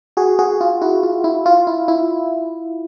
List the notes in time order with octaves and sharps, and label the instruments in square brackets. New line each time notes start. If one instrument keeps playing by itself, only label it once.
[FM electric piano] F#4 G#4
F#4 G#4
F4
E4 F#4
F4
E4
F4
E4
E4